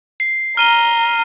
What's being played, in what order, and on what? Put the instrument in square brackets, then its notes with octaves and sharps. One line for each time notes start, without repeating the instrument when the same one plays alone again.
[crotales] C7
[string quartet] A#5 [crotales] F6 D#7 G7